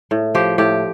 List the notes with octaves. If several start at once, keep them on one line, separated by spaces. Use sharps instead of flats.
A2
F3 G4
A2 G4